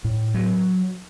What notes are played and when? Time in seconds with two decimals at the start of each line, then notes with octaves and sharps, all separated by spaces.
0.04 A2
0.34 F#3